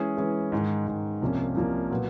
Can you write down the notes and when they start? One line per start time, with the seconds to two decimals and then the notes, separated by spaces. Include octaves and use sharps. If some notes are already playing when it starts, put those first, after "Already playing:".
Already playing: E3 G#3 C#4 E4 G#4
0.17 E3 G#3 C#4 E4 G#4
0.52 G#2 D#3 G#3
0.87 G#2 D#3 G#3
1.22 C2 C3 F3 A#3 C#4
1.56 C2 C3 F3 A#3 C#4
1.90 A#2 F#3 B3